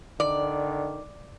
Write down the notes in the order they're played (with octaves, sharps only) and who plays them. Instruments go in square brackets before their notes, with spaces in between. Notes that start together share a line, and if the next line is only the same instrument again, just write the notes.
[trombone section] D3 D#3 [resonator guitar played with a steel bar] D5